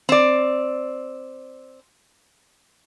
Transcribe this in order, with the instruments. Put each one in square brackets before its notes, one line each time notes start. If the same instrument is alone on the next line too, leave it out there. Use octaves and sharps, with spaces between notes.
[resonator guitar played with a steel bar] C4 D5